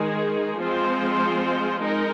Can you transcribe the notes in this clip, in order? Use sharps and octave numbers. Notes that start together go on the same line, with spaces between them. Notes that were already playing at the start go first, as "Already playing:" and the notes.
Already playing: D#3 G#3 D#4 G#4
F3 G#3 C4 F4 C5
G#3 D#4 A#4